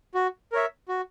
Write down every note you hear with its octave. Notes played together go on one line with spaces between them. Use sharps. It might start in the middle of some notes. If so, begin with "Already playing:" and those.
F#4
A#4 C#5 E5
F#4